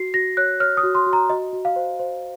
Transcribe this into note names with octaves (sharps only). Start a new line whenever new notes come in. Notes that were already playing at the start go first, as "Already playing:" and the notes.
Already playing: F#4 C7
F#4 A#6
C#5 F#6
C#5 F6
D#6
F#4
C6
F#4
A#5
F#4 D#5
F#4
F5
C5
C5